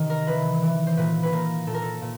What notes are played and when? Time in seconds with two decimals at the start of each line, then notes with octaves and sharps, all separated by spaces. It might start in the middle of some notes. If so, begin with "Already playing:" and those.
Already playing: C3 D#3
0.10 A#4
0.27 E3 B4
0.62 E3
0.87 C5
0.97 A#2 B4
1.23 B4
1.32 A#2 A#4
1.67 A#2 A4
1.74 A#4
1.82 A4
2.02 A#2